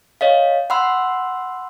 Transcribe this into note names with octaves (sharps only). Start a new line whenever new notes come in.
C#5 D#5 F5
F#5 B5 C6 E6